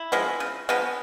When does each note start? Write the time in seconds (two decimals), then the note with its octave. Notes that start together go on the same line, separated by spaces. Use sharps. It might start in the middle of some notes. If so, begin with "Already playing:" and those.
Already playing: E4
0.12 F3 G#3 B3
0.40 C#3
0.69 F3 G#3 B3